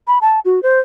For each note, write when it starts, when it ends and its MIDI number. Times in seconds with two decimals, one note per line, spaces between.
0.08 0.19 83
0.21 0.40 81
0.45 0.62 66
0.63 0.80 72